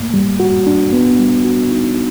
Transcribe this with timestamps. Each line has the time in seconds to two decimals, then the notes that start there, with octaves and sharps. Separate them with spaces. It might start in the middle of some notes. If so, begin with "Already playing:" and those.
Already playing: A2 A3 A#3
0.14 G3
0.40 F#4
0.67 D4
0.93 B3
1.19 G3
1.45 F#4
1.71 D#4